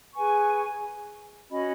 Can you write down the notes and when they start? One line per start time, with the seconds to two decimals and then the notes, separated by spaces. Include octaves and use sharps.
0.13 G#4 B4 G#5 C#6
1.50 C#4 F#4 D#5 B5